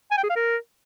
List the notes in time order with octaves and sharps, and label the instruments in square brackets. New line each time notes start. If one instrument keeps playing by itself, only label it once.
[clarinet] G#5
G5
G#4
F5
A#4